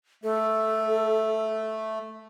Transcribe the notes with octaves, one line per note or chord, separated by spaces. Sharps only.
A3 A4